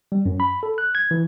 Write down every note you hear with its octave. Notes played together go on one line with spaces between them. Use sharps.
G3
F#2
B5
A4
F#6
G#6
E3